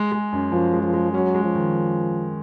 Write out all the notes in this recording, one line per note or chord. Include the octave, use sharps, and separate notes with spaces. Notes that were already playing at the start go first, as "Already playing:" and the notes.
Already playing: G#3
G#3
F#2
F#2 F3
G#3
F3
G#3
F#3 C#4
G#3
F3
D#3